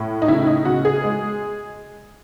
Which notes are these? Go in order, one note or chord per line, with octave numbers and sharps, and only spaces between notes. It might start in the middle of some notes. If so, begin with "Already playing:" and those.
Already playing: A2
D#4
C#3 E4
D#4
C#3 F#4
G#4
G#3